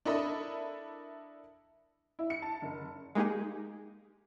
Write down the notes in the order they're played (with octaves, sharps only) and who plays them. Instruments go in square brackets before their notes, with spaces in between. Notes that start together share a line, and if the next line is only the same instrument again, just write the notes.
[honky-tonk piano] D4 E4 A4 A#4 D#5 B5
E4
C#7
A5
F#1
[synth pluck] G#3 A#3 D#4 G4 G#4